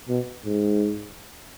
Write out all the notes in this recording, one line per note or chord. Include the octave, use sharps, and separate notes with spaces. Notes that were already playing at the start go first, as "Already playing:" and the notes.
B2
G#2